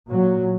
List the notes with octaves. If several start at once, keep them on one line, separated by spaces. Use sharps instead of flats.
A#2 F#3